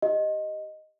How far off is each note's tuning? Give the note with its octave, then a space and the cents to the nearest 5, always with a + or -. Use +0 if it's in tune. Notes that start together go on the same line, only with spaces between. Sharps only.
G4 +0 D#5 +0